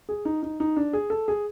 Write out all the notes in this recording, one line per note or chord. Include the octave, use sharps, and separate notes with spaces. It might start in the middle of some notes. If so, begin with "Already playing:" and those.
G#4
D#4
D#4
D#4
D4
G#4
A4
G#4